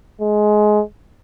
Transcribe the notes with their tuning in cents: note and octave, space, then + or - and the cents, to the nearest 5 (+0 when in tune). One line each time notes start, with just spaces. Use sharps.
G#3 +20